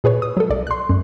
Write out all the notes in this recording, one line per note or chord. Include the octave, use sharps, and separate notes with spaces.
A#2 G#4 B4 C#5
D#6
F#3 A4
B1 D5
C6 F#6
F#2